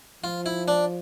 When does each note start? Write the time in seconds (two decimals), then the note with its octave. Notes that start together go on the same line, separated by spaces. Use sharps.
0.24 F3 F4
0.46 E4
0.68 D4